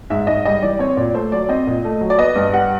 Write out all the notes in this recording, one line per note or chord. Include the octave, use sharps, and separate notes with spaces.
G#2 E5
G#2 D#5
G3 D#5
E3 D5
C4 C#5
A#2 D5
A3 C5
F#3 D5
C4 D#5
A#2
A3
F#3
D5
B3 D#5
G2
G3 F#5